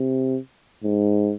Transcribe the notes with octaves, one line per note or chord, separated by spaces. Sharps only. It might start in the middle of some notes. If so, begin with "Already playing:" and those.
Already playing: C3
G#2